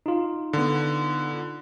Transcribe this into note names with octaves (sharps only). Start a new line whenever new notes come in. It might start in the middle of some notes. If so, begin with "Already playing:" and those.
D#4 F4
D3 B3